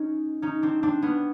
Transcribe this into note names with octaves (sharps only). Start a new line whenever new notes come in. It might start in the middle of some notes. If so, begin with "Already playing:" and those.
Already playing: C#4 D#4
C#4 D#4
C4 D4
C4 D4
B3 C#4